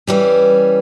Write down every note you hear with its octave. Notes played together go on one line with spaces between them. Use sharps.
E3 G3 C#4